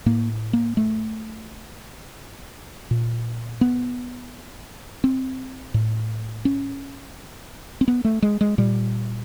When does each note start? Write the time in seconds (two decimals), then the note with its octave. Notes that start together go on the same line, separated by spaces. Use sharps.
0.06 A2 A#3
0.53 A#3
0.77 A3
2.91 A#2
3.61 B3
5.04 C4
5.74 A2
6.45 C#4
7.81 C4
7.88 B3
8.05 A3
8.22 G#3
8.41 G#3
8.58 A#2 G3